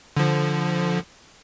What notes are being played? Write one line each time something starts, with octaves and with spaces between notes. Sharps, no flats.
D3 F3